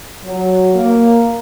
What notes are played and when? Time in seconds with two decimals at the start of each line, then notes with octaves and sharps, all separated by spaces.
0.24 F#3
0.74 A#3